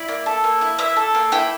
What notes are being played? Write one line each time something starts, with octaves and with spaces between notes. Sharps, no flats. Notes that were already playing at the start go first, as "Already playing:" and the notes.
Already playing: E4 D5
A#3
A4
A#3
E4
A#3 E5
A4
A#3
E4 G5